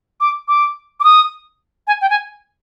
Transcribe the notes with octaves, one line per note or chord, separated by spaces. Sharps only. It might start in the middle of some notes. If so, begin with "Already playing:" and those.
D6
D6
D6
D#6
G#5
G5
G#5